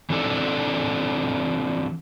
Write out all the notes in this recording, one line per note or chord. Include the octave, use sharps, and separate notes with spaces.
E3 C4 D4 A4 D5